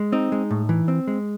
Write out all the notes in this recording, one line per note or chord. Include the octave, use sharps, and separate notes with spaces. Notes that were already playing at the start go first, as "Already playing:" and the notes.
Already playing: G#3
C4 D#4
G#3
A2
E3
C4
G#3